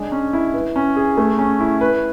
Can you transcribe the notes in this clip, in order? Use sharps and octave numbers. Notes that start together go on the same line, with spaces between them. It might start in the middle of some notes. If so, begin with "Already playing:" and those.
Already playing: G#3 D4
C#4
E4
B4
C#4
G#4
A3
C#4
E4
B4